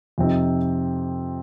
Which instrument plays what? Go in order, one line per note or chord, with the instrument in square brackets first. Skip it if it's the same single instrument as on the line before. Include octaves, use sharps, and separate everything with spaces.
[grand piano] F2 C3 F3 C4 D#4